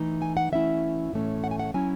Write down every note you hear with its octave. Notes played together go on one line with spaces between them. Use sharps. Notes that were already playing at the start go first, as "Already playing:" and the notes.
Already playing: E3 A3 D#4
G#5
F#5
E3 A3 C#4 E4 E5
A2 E3 A3 C#4
F#5
G#5
F#5
F#3 C#4 E4 G#5